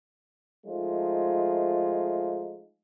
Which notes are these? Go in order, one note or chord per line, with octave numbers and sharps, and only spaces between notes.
F3 G#3 A3 D#4 F4